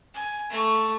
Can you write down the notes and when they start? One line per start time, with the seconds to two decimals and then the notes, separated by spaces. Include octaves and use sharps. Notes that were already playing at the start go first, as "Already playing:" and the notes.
0.14 G#5
0.50 A3 C#6